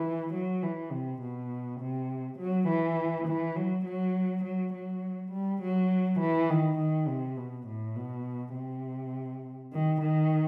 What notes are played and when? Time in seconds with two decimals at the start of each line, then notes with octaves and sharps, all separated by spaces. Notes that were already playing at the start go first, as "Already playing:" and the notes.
Already playing: E3
0.33 F#3
0.62 E3
0.92 C3
1.22 B2
1.80 C3
2.38 F#3
2.68 E3
3.27 E3
3.56 F#3
3.85 F#3
4.44 F#3
4.73 F#3
5.32 G3
5.62 F#3
6.20 E3
6.50 D#3
6.78 D#3
7.08 C3
7.37 B2
7.67 A2
7.96 B2
8.55 C3
9.72 D#3
10.01 D#3